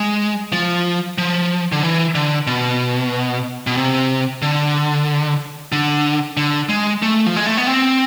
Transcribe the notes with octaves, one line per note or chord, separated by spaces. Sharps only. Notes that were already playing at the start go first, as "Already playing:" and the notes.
Already playing: G#3
F3
F3
D3
E3
D3
B2
B2
C3
D3
D3
D3
G#3
A3
F3
G#3
A3
B3
C4